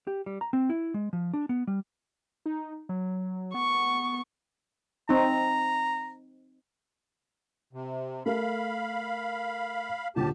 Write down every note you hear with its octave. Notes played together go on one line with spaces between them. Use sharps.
G4
G3
A#5
C4
E4
G#3
F3
D4
B3
G3
D#4
F#3
B3 C#6
C4 D#4 A#5
C3
A3 A#4 F5 B5
D#2 A#2 D3 D4 G4 A5